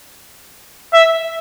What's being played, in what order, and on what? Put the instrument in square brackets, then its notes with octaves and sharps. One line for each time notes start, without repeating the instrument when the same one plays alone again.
[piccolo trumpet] E5